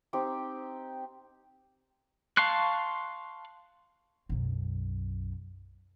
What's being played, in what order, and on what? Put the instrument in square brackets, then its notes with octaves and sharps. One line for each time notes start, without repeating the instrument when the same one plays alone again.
[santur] C4 D#4 G4 G5
[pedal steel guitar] F5 A5 C6 C#6 F#6
[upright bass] B1 F#2